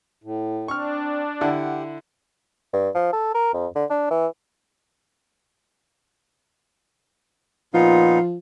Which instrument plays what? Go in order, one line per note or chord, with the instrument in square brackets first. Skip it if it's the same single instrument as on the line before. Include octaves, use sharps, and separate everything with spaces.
[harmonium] A2
[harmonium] C4 [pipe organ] D4 [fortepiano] C#6 F6
[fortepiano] D3 E4 [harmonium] G4 F#5
[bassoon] G2
F3
A4
A#4
F2
D3
D4
E3
[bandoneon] A#2 B3 D#4 [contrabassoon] F3 [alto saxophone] F4